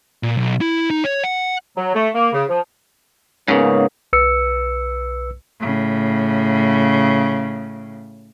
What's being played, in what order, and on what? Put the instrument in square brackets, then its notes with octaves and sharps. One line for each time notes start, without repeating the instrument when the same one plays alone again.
[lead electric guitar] A#2
B1
E4
D#4
C#5
F#5
[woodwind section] F#3
A3
A#3
C#3
F3
[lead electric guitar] G#2 C#3 [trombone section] A#3 B3 C#4
[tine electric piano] B1 B4 E6 C#7
[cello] A2 C#3